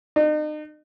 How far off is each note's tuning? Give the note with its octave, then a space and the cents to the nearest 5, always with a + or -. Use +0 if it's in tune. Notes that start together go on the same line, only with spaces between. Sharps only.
D#4 -40